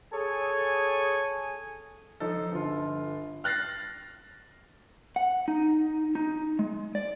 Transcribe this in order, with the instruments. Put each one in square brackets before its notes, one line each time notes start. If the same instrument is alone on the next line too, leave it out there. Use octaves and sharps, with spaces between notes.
[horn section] G#4 A4 C#5 G#5
[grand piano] F3 D#4 A4
G1 F4
F6 F#6 A6 A#6 C7
[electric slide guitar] F#5
D#4
D#4
G#3
D5